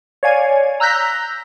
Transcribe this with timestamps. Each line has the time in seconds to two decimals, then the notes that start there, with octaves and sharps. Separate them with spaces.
0.23 C#5 D5 F5 G#5 G#6
0.80 A#5 E6 F#6 G6 A#6 B6